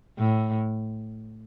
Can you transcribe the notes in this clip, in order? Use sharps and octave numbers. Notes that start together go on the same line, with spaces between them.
A2